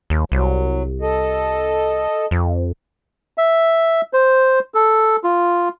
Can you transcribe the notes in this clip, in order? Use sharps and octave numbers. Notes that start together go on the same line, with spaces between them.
D#2
C2 F#3
A4 D#5
F2
E5
C5
A4
F4